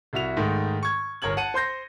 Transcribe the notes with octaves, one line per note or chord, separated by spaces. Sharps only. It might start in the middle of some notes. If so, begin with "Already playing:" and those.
C2 E4 F#4 F7
G#2 D#3 A3
C#6 G#6
G1 A#4 C#5 G#6 F#7
F#5 A5 C#7 D#7
C5 C6 G6 A#6